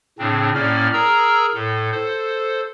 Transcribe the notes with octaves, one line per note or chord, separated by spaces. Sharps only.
A2 C#3 C4 D4
A2 A#3 C#4 D5 F6
G#4 A#4 A#5 E6
A2 A4
A4 C5